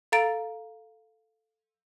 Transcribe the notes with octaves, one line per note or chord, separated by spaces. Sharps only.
A4 F5 A#5 A6 D7